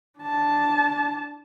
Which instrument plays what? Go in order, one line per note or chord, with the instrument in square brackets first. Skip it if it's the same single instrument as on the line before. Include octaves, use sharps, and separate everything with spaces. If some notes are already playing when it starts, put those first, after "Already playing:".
[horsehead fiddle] D4 A5